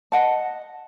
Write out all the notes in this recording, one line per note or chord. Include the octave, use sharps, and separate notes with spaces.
D#5 F#5 A5